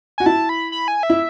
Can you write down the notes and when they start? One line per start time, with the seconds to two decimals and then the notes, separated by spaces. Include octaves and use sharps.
0.18 F#4 G#5
0.26 E4 A5
0.49 B5
0.72 B5
0.88 G#5
1.03 E5
1.10 E4